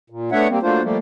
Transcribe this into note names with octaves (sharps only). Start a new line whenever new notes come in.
A#2
A3 B3 D4 C#5 E5 F#5
G3 A#3 C4
F#3 A3 A#3 D4 F4 C5
F3 G3 A3 A#3